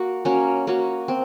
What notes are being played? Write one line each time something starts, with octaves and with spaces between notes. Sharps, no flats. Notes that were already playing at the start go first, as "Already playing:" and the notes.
Already playing: A#3 F#4
A#3 C#4 F#4
A#3 C#4 F#4
C4